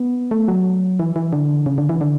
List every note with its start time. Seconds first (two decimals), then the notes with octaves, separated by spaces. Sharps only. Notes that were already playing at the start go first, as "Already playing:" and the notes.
Already playing: B3
0.31 A3
0.48 F#3
0.99 E3
1.16 E3
1.33 D3
1.66 C#3
1.78 D3
1.89 E3
2.01 D3